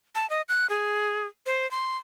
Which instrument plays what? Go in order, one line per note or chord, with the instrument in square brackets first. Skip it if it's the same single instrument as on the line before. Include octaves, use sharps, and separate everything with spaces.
[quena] A5
D#5
F#6
G#4
C5
C6